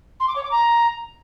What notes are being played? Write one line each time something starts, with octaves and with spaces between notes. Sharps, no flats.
C6
D6
C#5
D6
A#5